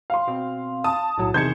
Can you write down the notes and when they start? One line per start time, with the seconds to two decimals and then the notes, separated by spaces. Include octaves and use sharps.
0.10 F5 C6
0.27 B2 C4
0.84 A5 D#6
1.18 B1 A2 F#3
1.34 E2 C3 D#3 G#4 C5 G6 G#6 C#7